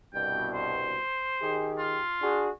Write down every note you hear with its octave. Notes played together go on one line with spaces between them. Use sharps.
C2 G2 B2 G5
C5
D#3 G4 G#4
F4
D4 F#4 G#4